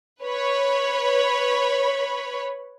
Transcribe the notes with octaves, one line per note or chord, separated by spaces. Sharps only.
B4 C#5 B5